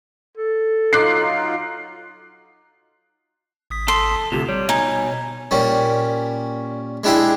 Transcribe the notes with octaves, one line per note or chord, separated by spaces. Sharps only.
A4
F#3 D#4 F4 D6 F#6 C7
G#1 D#6 B6
A4 C6
D2 C3 F4 G4 A4
G3 C#5
B2 D#4 G#5
A#2 G3 C#4
G#3 D4 E4 G4 G#4 E5